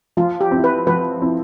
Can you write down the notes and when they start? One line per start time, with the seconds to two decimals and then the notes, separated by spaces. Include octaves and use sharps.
0.17 F3 F4
0.41 G4
0.51 C4 E4
0.64 B4
0.87 F3 B4
1.22 C4 E4